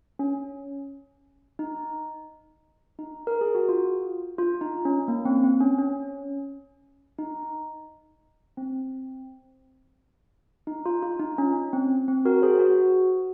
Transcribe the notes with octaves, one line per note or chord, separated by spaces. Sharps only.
C#4
D#4
D#4
A#4
G#4
F#4
F4
F4
D#4
C#4
A#3
C4
C4
C#4
C#4
D#4
C4
D#4
F4
F4
D#4
C#4
C4
C4
F#4 A#4
G#4 C5
F#4